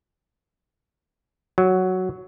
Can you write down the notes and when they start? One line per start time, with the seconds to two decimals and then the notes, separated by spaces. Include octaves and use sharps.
1.58 F#3